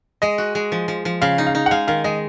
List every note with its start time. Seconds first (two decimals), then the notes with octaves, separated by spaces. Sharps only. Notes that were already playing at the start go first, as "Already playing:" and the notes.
0.22 G#3 D#5
0.38 F#4
0.55 G#3
0.72 F3
0.88 F3
1.05 F3
1.21 C#3 F5
1.38 D#4
1.47 F5
1.55 D#4
1.66 F#5
1.71 G#3 F5
1.87 D#3 F5
2.04 G#3 D#5